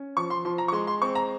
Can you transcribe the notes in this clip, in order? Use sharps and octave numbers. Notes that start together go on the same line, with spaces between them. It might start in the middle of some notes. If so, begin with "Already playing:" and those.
Already playing: C#4
F3 C#6
C6
F3 C6
A#5
C#6
G#3 C6
C6
C4 C#6
A#5